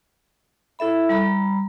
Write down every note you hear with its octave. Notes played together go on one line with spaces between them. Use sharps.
E4 A4 E5 B5
G3 A#5 B5